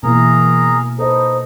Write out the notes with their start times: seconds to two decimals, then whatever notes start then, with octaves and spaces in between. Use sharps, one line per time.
0.03 B2 E3 A#3 E4 G#4 A#4 A#5
0.99 D#4 A4 B4 C5 D#5